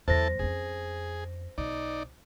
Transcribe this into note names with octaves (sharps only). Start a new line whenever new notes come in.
E2 F#3 E4 A4 C5 A5 A#6
F2 C#4 G#4
B1 D#4 D5